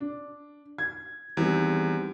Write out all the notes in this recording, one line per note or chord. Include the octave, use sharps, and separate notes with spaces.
D4
G#6
E2 D#3 G3 C4